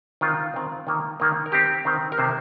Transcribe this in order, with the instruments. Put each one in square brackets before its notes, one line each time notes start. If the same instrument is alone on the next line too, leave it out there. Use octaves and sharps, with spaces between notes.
[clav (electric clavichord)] D#3 C4 F4
D#3 C4
D#3 A#3
D#3 A#3
A#4
D#3 C4 G4
D#3 C4
A#4
C3 D#3 A#3 C5